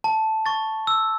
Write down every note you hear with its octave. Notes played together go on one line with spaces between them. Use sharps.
A5
C#6 A6
E6